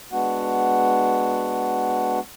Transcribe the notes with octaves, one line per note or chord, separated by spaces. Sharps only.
G#3 B3 D4 F#4 F#5